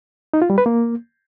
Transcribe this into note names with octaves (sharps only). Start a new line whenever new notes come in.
D#4
F4
G3
B4
A#3